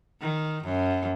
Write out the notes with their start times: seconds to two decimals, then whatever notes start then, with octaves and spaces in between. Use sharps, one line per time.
0.21 D#3
0.64 F#2